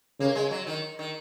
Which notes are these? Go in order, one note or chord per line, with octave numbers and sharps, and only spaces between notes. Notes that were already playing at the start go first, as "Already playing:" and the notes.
C#3 A#3
G#3
F#3
D#3
D#3